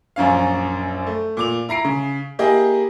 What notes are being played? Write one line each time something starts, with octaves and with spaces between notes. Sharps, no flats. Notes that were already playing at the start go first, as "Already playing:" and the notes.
A#1 F#2 C#4 F5
A3
A#2 D6 F7
E4 A#5 C7 D7
C#3
A#3 E4 G4 G#4 D#5